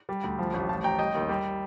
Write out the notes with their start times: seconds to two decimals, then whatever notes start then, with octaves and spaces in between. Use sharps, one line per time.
0.09 G3
0.24 D2
0.39 F3
0.54 A1
0.69 F3 F5 A5
0.84 A1 G5 A#5
0.99 G3 D#5 G5
1.15 D#2
1.29 G3